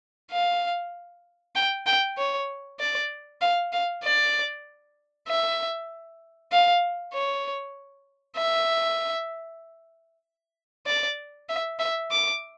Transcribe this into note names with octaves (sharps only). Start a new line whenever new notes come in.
F5
G5
G5
C#5
D5
F5
F5
D5
E5
F5
C#5
E5
D5
E5
E5
D6